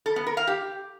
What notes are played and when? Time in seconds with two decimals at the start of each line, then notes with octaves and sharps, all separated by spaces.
0.06 A4
0.16 B3
0.27 A#4
0.37 F5
0.47 G4